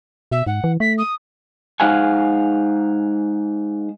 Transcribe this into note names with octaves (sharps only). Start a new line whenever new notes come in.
B2 E5
G#2 F#5
E3
A3 B6
D#6
G#3 D#4 C5 F5 F#5 G#5